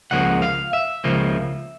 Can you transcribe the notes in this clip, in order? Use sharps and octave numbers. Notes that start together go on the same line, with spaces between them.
C#2 C#3 F3 A#3 F#5
F5
E5
C#2 C#3 F3 A#3